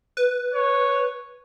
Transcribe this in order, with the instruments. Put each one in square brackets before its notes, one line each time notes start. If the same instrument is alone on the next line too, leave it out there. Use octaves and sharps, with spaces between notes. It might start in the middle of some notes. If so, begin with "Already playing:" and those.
[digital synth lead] B4
[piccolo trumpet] C#5